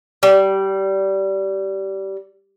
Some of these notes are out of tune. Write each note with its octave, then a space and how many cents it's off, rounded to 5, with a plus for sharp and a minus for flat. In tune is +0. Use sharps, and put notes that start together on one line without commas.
G3 -20